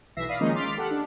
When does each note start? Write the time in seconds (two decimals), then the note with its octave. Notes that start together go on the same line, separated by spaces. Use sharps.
0.16 B1 E3 E5 A#6 C7
0.28 D5 F5 B5 D#6 C7
0.41 D#3 F3 G#3 A#3 C#4 D#4
0.55 C6 D6 F6 A6 B6
0.77 G4 A4 F#5
0.91 D4